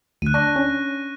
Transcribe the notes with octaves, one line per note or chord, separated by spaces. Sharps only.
D2 F#6 D#7
D4 C#6 A#6 D#7
C#4